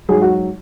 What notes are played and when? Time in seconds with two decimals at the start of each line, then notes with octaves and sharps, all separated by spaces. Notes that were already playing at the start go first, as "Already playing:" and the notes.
0.09 G#2 F#3 G#4
0.22 F#4